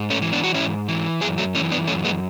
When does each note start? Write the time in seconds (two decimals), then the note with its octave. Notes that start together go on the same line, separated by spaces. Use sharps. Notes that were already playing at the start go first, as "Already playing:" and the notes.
Already playing: G#2
0.10 A3 C#4
0.22 E3
0.33 B3 D4
0.44 F#4
0.54 G#2 C#4 E4
0.88 E3
1.21 F#2 E4 G#4
1.38 F#3 A3
1.55 E3 A3 C#4
1.72 B3 D4
1.88 F#2 A3 C#4
2.05 G#3 B3